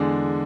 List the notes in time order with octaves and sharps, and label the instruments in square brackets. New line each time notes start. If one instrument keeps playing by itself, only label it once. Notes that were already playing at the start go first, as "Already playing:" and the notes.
Already playing: [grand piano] E2 D3 G#3 D4 G#5